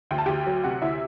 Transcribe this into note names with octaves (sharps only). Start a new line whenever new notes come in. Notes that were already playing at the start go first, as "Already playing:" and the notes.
D2 G5
A5
D2 G4 G5
F#3
C3 F#4 F#5
D2 E4 E5